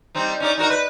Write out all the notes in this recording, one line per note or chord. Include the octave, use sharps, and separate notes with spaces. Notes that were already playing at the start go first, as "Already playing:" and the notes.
G3 C4 D#4
C#4 D#4 D5
D#4 F#4 A#4
B4